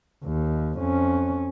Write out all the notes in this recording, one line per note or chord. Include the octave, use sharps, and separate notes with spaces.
D#2
F2 C#4